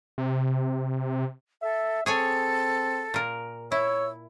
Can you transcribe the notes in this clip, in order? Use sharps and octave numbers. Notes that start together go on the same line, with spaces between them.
C3
A4 E5
C4 G#4 A4 C#5 G#5
A#2 A#4
E4 C#5 E6